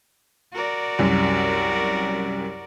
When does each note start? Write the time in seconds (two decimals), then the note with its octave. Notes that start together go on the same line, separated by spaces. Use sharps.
0.53 F#4 A#4 D5
0.99 C2 F#2